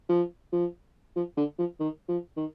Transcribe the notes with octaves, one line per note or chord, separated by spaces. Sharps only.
F3
F3
F3
D3
F3
D#3
F3
D#3